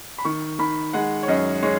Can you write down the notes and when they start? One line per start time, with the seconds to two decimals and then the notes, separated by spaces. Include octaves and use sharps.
0.18 B5
0.25 D#3 C#6
0.59 D#3 B5
0.93 G#3 F#5
1.23 C#5
1.28 F#2 D#5
1.63 G#3 C#5